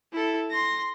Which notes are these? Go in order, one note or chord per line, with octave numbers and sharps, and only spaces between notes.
E4 A4
C6 A#6